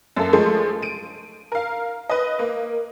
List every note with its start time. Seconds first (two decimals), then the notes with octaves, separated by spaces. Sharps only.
0.16 F#2 A#3 A4
0.33 F3 G#3 A3 G#4
0.82 D7 D#7
1.52 A#4 F5
2.09 B4 D#5
2.39 A#3